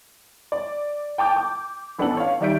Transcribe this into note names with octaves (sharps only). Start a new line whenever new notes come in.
D5
G5 A5 D6 G6
D6
A1 B3 D4 A4 F#7
C#5 F5
D#3 G3 D5 E5 G6 D7